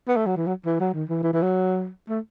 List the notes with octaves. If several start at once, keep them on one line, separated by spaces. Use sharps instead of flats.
B3
A3
F#3
E3
F#3
E3
F#3
D#3
E3
E3
E3
F#3
A3